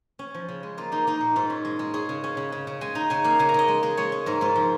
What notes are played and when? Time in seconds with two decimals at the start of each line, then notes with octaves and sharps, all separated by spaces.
0.19 C#4
0.34 F3
0.49 C#3
0.63 G#3
0.77 A#3 F4
0.92 A#3 D#4
1.07 A#3 D#4
1.21 A#2
1.36 G#2 F4
1.50 C#4
1.65 G#3
1.79 G#3
1.94 C#4 G#4
2.09 C#3
2.24 C#4
2.37 C#3
2.52 C#3
2.67 C#3
2.81 G#3 G#5
2.95 D#4 A#5
3.10 C#3 G#5
3.24 A#3 F5
3.39 C#3 G#5
3.49 A#5
3.54 C#3 D#5
3.68 G#3
3.83 G#3
3.97 G#3 C#5
4.12 C#4
4.26 G#2 A#4
4.41 G#2 F4
4.56 F3